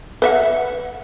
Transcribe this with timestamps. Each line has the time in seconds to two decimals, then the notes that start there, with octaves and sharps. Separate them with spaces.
0.22 B4 E5 F#5